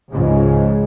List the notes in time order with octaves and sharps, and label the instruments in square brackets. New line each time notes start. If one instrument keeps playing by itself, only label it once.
[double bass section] C#2 G#2 C#3 F3 G#3